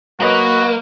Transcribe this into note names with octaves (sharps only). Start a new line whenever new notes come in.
F#3 A#3 F#4 B4 D#5